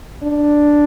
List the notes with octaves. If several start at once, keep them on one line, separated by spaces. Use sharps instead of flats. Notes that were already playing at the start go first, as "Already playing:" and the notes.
D4